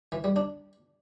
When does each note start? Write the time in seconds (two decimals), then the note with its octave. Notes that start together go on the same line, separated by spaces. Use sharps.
0.12 E3
0.24 G3
0.36 D4